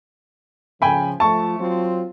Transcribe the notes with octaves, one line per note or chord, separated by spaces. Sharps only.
C#3 F3 G5 G#5 B5
F3 A3 A5 C#6
F#3 C4 F4